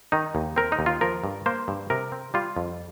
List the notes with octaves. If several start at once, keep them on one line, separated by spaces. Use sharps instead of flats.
D#3 D#4
D#2
C4 A#4
D#4
D#2
F4
F3 A#4
G2
A#3 C5
G2
C3 A#4
C4
G3 F4
F2